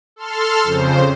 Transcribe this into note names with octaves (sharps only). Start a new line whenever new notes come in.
A4 C6 F6
F2 C#3 C5